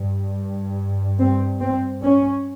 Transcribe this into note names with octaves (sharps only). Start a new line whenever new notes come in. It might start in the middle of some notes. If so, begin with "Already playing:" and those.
Already playing: G2
C4
C4
C#4